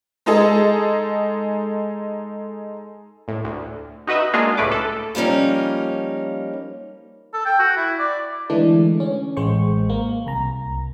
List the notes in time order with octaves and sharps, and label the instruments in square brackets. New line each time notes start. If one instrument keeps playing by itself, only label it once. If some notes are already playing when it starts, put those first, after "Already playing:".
[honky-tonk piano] G#3 D#4 G#4 A4
[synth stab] A2
D2
D#4 F#4 B4 D#5 E5
G#3 A#3 D4 F4 F#4 G#4
C#2 A2 A3 B4 D6
A4
[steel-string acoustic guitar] F3 G3 A#3 C#4 D#4
[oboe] A4
G5
F#4
E4
D5
[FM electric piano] D3 E3 G#3 A3 D4
C#4
A1 G#3 C5 C#6
A#3
C2 A#5